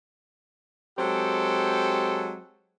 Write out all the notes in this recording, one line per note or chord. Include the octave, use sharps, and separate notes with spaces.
F#3 G#3 C4 G4 A4